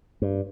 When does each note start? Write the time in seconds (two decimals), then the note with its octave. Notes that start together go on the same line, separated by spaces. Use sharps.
0.22 G2